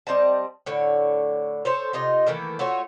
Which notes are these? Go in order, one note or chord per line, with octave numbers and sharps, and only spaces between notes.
G3 C4 D#5 A5
A2 D3 C#5
A4 C5 C#5
C3 D#4 F4 D#5
D#3 E3 A3 A#3
A3 F4 F#4 C#5